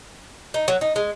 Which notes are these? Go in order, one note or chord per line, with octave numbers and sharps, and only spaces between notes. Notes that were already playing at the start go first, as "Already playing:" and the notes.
D#4
F#3
D#4
G#3